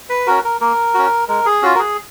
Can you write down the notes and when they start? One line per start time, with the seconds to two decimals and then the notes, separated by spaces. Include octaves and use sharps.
0.10 B4
0.27 C#4 F#4 A#4
0.44 A#4
0.61 A#3 A#4
0.94 C#4 F#4
1.28 G#3 A#4
1.46 G#4
1.62 C#4 F4 F#4
1.75 A#4
1.79 G#4